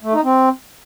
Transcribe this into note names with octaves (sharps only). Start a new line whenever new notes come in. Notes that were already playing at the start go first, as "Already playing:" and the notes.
A3
D#4
C4